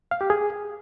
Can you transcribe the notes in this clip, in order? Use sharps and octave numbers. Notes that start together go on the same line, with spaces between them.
F5
G4
G#4